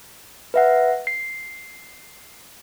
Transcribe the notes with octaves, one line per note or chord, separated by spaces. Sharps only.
B4 E5 F#5
C7